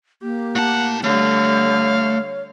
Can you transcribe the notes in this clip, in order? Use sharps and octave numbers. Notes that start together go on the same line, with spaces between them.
A#3 G4
A2 F#5 A5
D3 G3 A3 C#5 F5